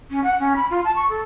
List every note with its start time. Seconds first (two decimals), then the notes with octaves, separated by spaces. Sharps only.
0.10 C#4
0.23 F#5
0.40 C#4
0.56 B5
0.70 F4
0.84 A5
0.95 C#6
1.09 A4